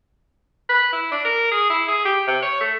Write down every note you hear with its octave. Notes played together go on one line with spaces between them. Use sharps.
B4
E4
D4
A#4
G#4
E4
G#4
G4
C3
C#5
A3